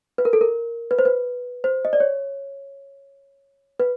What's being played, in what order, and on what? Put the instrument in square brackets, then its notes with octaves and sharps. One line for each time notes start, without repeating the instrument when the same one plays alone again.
[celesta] B4
A#4
A4
A#4
B4
C5
B4
C5
D#5
D5
C#5
B4